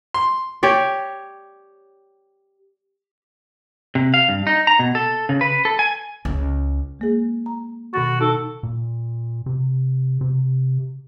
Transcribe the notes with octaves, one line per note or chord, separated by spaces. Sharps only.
C6
G4 C#5 D5
C3
F5
G2
D#4
A#5
B2
A4
C#3
B4
A4
G#5
C#2
G#3 A#3 G#4
A#5
B2 D#3 F#4 A6
D#4 A4
A#2
C3
C3